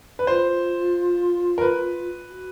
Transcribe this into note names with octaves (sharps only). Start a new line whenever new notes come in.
B4
F4 C5
A#4
B4
F#4